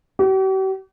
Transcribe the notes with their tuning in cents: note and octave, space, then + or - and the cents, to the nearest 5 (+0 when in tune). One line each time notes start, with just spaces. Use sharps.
G4 -45